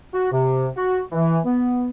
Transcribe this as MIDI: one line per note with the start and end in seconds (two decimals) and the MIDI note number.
0.13 0.30 66
0.32 0.67 48
0.76 1.01 66
1.12 1.39 52
1.45 1.89 59